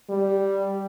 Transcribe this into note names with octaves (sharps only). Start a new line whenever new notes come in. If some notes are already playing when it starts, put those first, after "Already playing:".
G3